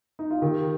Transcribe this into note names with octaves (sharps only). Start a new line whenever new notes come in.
D#4
F4
D#3 G4